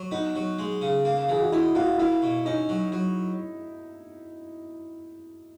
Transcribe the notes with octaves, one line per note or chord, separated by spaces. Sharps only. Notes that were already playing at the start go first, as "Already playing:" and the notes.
Already playing: F#3
B3 D#4
F#3
G#3
C#3
A#3
E3 G#4
F#4
D#4 E4
A#3 F#4
A#3 E4
B2
C#4 D#4
F#3
F#3